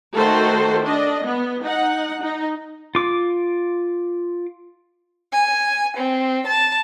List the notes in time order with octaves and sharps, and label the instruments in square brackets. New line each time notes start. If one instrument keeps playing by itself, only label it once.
[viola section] D#3 A3 F#4 A4 C5
D4 D#5
B3
D#4 F#5
D#4
[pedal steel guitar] F4 D6
[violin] G#5
C4
A5